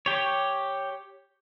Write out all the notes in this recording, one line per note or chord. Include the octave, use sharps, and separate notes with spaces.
G4 C#5